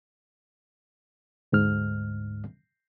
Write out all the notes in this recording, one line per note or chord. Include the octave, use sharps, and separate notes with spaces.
D2 G#2 F6